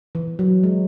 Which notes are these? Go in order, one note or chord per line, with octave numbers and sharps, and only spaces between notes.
E3
F#3
G#3